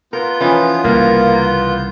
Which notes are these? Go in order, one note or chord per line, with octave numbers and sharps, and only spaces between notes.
B3 F4 A#4 G6
E3 F3 C#4 D#4
C2 C#3 A#3